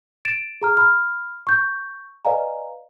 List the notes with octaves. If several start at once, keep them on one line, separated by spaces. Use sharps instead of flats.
A6 D7 E7
G#4 A#5 F6
B5 F6
C#6 G6
B4 D5 D#5 F5 G#5 A#5